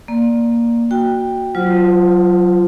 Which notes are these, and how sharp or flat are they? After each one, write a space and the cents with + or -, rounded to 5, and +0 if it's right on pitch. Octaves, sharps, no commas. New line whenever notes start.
A#3 +5 D5 +0
F#4 +0 G5 +10
F#3 +0 F4 -10 C5 +0